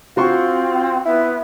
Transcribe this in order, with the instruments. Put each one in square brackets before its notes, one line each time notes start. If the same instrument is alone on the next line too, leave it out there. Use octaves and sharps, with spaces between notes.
[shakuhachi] C4 [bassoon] F4 [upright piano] F#4 C6 C#6
[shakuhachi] B3 [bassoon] E4